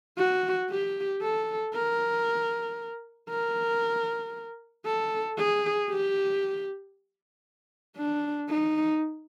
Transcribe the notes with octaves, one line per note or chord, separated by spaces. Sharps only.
F#4
G4
A4
A#4
A#4
A4
G#4
G4
D4
D#4